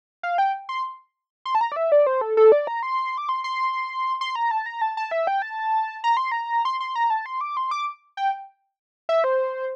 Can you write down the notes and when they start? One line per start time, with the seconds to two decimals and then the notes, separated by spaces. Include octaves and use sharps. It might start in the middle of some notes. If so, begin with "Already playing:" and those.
0.23 F5
0.38 G5
0.69 C6
1.45 C6
1.55 A5
1.61 A#5
1.72 D5
1.76 E5
1.92 D5
2.07 C5
2.21 A4
2.37 A4
2.52 D5
2.67 A#5
2.83 C6
3.18 D6
3.29 C6
3.44 C6
4.21 C6
4.36 A#5
4.51 A5
4.66 A#5
4.81 A5
4.97 A5
5.11 E5
5.27 G5
5.42 A5
6.04 A#5
6.17 C6
6.32 A#5
6.65 C6
6.80 C6
6.95 A#5
7.10 A5
7.26 C6
7.41 D6
7.57 C6
7.71 D6
8.17 G5
9.09 E5
9.24 C5